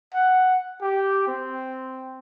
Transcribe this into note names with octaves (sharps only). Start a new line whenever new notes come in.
F#5
G4
C4